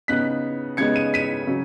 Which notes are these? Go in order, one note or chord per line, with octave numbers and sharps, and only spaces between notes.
C#3 B3 D#4 F#6 B6
C#3 G#3 B3 D#4 G#6 C#7
D#7
B6 D#7
C#3 F#3